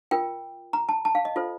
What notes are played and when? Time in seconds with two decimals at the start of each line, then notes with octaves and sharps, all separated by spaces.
0.11 F4 A#4 G5
0.73 A#5
0.89 A5
1.05 A5
1.15 F5
1.25 D#5
1.36 F4 A4 C5